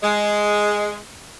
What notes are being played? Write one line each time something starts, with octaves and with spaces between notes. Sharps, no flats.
G#3